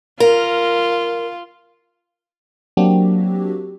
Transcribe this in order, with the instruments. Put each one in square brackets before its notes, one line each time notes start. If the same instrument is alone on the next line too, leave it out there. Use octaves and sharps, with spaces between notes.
[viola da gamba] F4 [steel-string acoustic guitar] A#4
[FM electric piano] F#3 A#3 C4 D4 F#4 G4